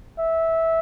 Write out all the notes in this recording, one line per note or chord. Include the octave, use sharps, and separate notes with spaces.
E5